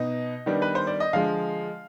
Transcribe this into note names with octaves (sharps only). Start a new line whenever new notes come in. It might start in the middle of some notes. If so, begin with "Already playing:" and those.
Already playing: B2 B3 D#4 D#5
D#3 G3 B3 D4
B4
C5
D5
D#5
D3 F3 G#3 F5